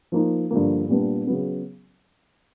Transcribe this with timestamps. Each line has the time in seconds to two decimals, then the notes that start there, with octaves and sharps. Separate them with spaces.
0.12 F3 A#3 D#4
0.50 G2 D3 F3 A#3
0.89 A#2 G3 B3 D4
1.27 C#3 F#3 B3